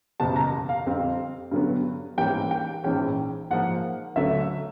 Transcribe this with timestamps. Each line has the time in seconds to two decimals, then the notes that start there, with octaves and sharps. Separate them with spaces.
0.20 F#1 E2 B2 G3 A5
0.36 A#5
0.69 F5
0.86 F2 D3 G3 C4
1.51 G2 D3 F#3 B3
2.17 G#2 E3 G3 A#3 C#4 G5
2.51 G5
2.84 A#1 G#2 E3 G#3 C#4 G5
3.51 G#2 F3 A#3 F#5
4.16 D2 D3 F#3 A3 E5